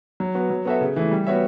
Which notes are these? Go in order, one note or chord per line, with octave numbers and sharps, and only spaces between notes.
F#3
B3 F#4
F#3
B3 F#4 A4 E5
C#3
E3 A3
G3
B3 F#4 C#5 E5